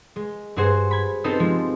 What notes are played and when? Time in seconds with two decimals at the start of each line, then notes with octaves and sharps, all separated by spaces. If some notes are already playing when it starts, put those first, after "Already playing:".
0.16 G#3
0.56 G2 F#4 G#4 C5
0.91 B5 G#6
1.24 B3 C4 D#4 G4 A4 C5
1.40 F3 G#3